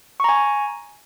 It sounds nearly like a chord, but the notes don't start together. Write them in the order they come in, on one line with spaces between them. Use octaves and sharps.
C#6 A#5 G#5